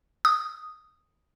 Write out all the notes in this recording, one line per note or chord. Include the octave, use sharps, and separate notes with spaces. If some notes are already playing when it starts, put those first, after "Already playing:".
D#6